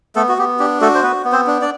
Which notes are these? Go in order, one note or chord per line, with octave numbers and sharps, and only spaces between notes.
A3 B3 A4
F#4
B3 G4
D4 G4
A3 F#4 A4
C5
B3 B4
B3
C4 C5
D4
D4 D5